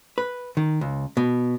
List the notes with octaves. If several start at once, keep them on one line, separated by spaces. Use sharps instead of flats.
B4
D#3
C#2
B2